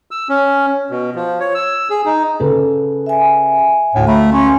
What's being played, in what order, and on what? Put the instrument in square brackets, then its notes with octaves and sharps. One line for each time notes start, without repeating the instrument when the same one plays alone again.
[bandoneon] E6
C#4
B2
F3
C#5
E6
G#4
D#4
[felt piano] C#3 A4 B4
[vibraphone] E5 G#5
[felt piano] D2 F5 [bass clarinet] A2
[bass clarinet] A3 [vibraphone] A#5 B5
[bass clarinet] C#4 [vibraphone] A#5 C6